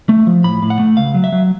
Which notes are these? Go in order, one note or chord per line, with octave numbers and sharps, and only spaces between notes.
A3
F3
A2 B5
A2
F#5
A3
C#2 F5
F#3
E5
F#3